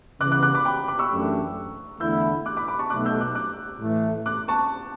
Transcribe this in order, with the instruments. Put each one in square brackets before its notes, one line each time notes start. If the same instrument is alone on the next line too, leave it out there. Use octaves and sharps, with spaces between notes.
[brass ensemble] C#3 E3 B3 [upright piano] D6 F#6
[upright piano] D6 F#6
D6 F#6
B5 D6
G5 B5
B5 D6
C#6 E6
[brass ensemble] F#2 E3 A3 D4 G4
[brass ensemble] E2 D3 A3 E4 [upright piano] E6 G6
[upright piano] D6 F#6
B5 D6
B5 D6
A5 C#6
[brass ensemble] B1 B2 A3 [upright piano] D6 F#6
[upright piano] E6 G6
D6 F#6
D6 F#6
[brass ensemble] A2 E3 A3
[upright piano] D6 F#6
A5 C#6